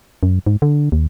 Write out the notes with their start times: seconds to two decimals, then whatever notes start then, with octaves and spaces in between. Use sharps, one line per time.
0.23 F#2
0.46 G#2
0.62 D3
0.92 D#2